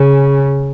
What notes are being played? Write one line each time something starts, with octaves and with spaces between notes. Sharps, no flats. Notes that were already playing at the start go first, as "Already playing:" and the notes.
Already playing: C#3